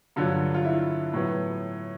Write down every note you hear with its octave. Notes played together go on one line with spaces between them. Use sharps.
G2 D3 F#3 F4
F4
E4
A2 F#3 B3